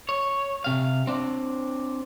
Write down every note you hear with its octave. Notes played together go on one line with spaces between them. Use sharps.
C#5
C3 F5
C4 D4